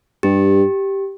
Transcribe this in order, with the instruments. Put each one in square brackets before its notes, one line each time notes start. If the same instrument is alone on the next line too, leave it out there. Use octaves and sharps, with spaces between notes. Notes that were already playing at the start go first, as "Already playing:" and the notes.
[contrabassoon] G2 [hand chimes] G4